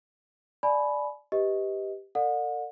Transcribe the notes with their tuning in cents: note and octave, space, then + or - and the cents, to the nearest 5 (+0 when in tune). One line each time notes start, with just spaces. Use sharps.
D5 +0 G#5 +40 B5 +0
G4 +0 B4 +0 D#5 +20
A4 +45 D5 +30 F#5 -40